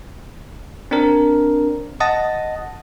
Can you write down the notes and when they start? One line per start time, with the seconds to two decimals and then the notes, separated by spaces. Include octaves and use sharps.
0.91 C4 D4 A#4
2.00 D#5 F#5 A5 D#6 A6 A#6